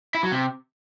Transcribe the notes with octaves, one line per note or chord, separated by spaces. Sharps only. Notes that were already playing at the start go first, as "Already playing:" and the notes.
E4
F#3
C3